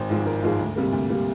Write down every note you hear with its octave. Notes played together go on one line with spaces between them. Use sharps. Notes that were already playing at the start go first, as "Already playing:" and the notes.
Already playing: G#1 C5
G#2 F3 G#3
G#1 A#4
G#2 F3 G#3
D2
C3 G3 A#3
D2
C3 G3 A#3